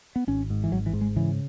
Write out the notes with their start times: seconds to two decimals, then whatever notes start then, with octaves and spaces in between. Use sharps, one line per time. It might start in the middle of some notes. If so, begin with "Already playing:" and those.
0.16 B3
0.27 G#1 C#4
0.50 G#2
0.64 E3
0.71 G#1 F#3
0.86 E3
0.93 G#2
1.01 G#3
1.16 C#3 E3